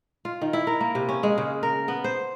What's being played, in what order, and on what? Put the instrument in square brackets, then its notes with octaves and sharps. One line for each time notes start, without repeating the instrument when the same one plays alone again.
[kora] F4
D#3
E4
A#4
A#3
C3
C#4
G#3
C#3
A#4
B3
C5